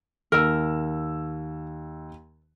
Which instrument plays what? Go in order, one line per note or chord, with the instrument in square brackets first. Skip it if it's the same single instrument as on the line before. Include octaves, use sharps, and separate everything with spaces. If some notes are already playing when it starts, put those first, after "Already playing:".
[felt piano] D#2 E6 [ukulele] A#4